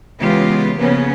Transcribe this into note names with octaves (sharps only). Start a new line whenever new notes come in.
C#3 E3 G#3 B3 F4 G4
C#3 F3 A#3 B3 C#4